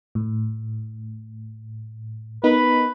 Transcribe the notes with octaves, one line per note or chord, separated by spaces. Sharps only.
A2
B3 D#4 A#4 B4